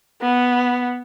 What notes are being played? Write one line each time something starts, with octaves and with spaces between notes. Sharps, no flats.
B3